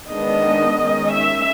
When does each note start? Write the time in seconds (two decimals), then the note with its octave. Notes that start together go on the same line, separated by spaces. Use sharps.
0.09 D#3 G#3 B3 D4 D#5
0.78 D#3 G#3 C#4
1.12 E5